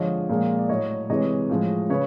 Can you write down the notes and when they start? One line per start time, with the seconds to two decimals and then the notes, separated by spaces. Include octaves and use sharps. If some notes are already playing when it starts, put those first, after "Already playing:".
Already playing: D3 F3 G#3 C#5 D#5
0.29 A#2 F3 G#3
0.59 D5
0.69 A2 F#3 C#5 D#5
1.09 C3 E3 G#3 C#5 D#5
1.49 A2 F3 G#3
1.90 C#3 B4 C#5